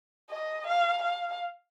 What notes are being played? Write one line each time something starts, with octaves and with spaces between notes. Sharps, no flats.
D#5
F5
F5